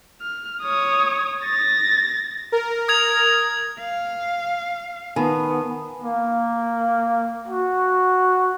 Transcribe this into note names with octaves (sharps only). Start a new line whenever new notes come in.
F6
C#5 D#6
A6 A#6
A#4
D#6 G#6 F7
F5
D#3 B3 G#5 A5 B5
A#3
F#4